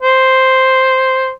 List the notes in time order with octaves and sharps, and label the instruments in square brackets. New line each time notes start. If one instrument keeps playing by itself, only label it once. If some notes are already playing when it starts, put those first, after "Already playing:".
[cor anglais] C5